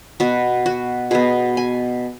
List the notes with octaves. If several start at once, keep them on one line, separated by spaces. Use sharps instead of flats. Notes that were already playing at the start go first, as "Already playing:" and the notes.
B2 B3 F#4
F#4
B2 B3 G#4
G#5